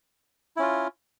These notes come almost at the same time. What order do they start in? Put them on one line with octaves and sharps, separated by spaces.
E4 C#4 F4